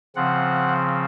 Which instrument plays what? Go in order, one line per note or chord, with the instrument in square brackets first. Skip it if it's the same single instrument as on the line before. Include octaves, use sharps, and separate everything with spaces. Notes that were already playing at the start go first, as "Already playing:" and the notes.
[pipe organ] C#3 F3 C4 F#5